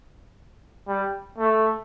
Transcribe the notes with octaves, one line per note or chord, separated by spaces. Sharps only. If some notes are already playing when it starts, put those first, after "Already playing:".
G3
A3